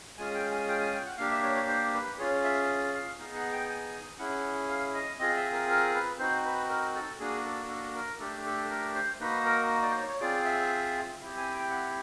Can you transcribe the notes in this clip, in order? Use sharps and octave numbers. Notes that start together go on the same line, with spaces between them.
G#3 C#4 F4 G#4 G#5
G5
G#5
G5
G#5
G5
F#5
A#3 D4 G4 F5
E5
C#5
C#5
C5
B4
C#4 F4 G#4 C#5
E5
F5
B3 D#4 G#4
F#5
G5
G#5
C#4 E4 G#4 F#5
F5
D#5
C4 F4 G#4 D#5
E5
A#4
A#4
B4
C4 D#4 F#4 C5
B4
A#4
A4
A#3 D4 F#4 G#4
A4
A4
A#4
A3 D4 G4 A4
A4
A#4
C5
A#3 D#4 F#4 B4
A#4
D5
C5
C#5
C#5
C4 F4 G#4 D5
E5
C4 E4 G4
G#5
G5
F#5